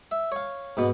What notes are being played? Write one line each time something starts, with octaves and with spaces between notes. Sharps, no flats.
E5
C#5 F5
G#2 B2 B3